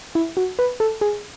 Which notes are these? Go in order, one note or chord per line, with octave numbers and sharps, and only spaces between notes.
E4
F#4
B4
A4
G#4